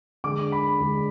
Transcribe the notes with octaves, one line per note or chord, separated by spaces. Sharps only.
D3 G#3 D4 D6
B5
D3 G#3 D4